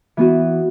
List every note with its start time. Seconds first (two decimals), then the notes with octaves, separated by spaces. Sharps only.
0.17 E3 B3 F#4